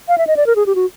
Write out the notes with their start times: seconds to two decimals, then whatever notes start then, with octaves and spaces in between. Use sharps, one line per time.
0.08 F5
0.18 E5
0.27 D#5
0.37 D5
0.46 A#4
0.56 G#4
0.66 G4
0.75 F#4